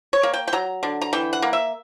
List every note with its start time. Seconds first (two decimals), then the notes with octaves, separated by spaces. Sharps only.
0.13 C#5
0.23 A#3
0.34 G5
0.48 G5
0.53 F#3 A#5
0.83 D3
1.02 A#5
1.13 E3 G5
1.33 F#5
1.42 A#3
1.53 E5